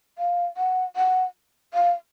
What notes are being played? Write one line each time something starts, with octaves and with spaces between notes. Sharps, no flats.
F5
F#5
F#5
F5